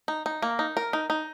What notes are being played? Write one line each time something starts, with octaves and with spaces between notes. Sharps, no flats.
D#4
D#4
A#3
D#4
A#4
D#4
D#4